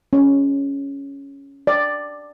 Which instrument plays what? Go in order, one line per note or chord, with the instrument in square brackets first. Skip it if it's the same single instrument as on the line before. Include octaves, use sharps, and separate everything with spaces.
[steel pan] C#4
D5